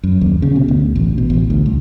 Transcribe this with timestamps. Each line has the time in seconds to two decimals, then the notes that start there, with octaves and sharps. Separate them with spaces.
0.04 F#2
0.21 D#2
0.42 C#3
0.56 B2
0.68 D2
0.96 A1
1.18 B2
1.30 A1
1.50 D2
1.66 C2